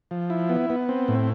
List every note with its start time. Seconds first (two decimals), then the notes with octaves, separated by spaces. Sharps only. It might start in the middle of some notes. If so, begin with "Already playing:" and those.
0.11 F3
0.30 E4
0.49 B3
0.70 B3
0.89 C4
1.08 A2